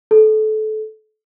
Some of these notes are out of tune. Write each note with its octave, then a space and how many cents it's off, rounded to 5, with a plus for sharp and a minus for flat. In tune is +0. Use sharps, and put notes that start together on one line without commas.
A4 -25